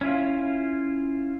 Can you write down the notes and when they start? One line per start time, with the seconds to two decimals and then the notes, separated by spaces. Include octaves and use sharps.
0.01 C#4 E4 F4